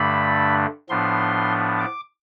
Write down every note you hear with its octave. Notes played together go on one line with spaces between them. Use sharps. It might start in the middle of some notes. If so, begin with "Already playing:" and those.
Already playing: G2 D3 A3 D4 B5
A2 F3 B3 D4 C6
D6